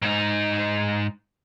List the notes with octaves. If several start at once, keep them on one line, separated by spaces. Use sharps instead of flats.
G#2 D#4